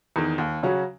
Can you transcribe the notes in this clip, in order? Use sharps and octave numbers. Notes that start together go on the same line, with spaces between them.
E2 D#3
D#2
C#3 F#3 C#4 F#4